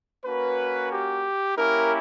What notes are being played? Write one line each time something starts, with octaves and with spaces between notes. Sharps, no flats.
A#3 C#4 F#4 B4
G4
A#3 C#4 E4 G4 A#4